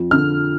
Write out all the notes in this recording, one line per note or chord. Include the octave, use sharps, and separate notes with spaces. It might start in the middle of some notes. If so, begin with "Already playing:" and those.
Already playing: F2
D3 F3 F6